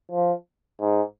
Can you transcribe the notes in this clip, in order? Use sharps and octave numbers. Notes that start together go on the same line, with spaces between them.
F3
G#2